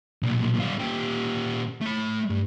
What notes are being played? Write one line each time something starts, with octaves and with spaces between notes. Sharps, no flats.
B1 A#2
G3 F4
A#2 G4
A3 B5
G2